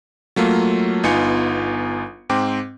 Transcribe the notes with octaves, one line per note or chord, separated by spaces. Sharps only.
F#3 A3 A#3 F4
G1 B3 D#4 F4 G#5 C#7
G#2 C4 G5 D6